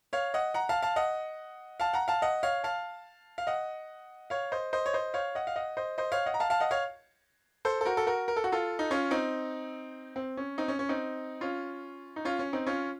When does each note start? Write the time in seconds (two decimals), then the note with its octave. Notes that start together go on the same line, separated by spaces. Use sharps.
0.13 C#5 F5
0.34 D#5 F#5
0.54 F#5 A#5
0.69 F5 A5
0.82 F5 A5
0.96 D#5 F#5
1.80 F5 A5
1.93 F#5 A#5
2.08 F5 A5
2.22 D#5 F#5
2.43 C#5 F5
2.64 F5 A5
3.38 F5
3.47 D#5 F#5
4.30 C#5 F5
4.52 C5 D#5
4.73 C5 D#5
4.86 C#5
4.93 C5 D#5
5.14 C#5 F5
5.35 D#5 F#5
5.47 F5
5.56 D#5 F#5
5.77 C5 D#5
5.98 C5 D#5
6.12 C#5 F5
6.26 D#5 F#5
6.34 A#5
6.40 F5 A5
6.50 F5 A5
6.60 D#5 F#5
6.71 C#5 F5
7.65 A4 C5
7.81 A4
7.85 F#4 A#4
7.97 A4
8.07 F#4 A#4
8.28 A#4
8.37 A4
8.44 F#4
8.52 F4 A4
8.79 D#4
8.91 C#4 F4
9.11 C4 D#4
10.16 C4
10.37 C#4
10.58 C4 D#4
10.68 C#4
10.79 C#4
10.89 C4 D#4
11.41 C#4 F4
12.16 D#4
12.25 C#4 F4
12.39 C#4
12.53 C4 D#4
12.67 C#4 F4